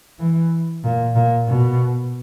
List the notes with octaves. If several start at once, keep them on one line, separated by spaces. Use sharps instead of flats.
E3
A#2
A#2
B2